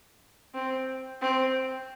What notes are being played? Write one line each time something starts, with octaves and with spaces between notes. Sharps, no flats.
C4
C4